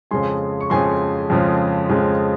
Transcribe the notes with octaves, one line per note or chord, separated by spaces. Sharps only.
F2 C#3 F3 G#3 G#5 C6
C#6
F2 C#3 F3 G#3 G#5 C6
F2 C#3 F3 G#3
F2 C#3 F3 G#3